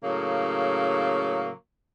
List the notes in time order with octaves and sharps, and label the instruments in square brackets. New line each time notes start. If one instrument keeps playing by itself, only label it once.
[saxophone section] A2 C#3 F#3 A#3